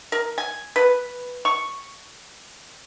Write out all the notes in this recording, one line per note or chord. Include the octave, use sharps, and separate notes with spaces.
A#4
G#5
B4
C#6